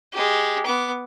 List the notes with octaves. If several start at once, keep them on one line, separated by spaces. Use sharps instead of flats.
G#3 G4
B3 D6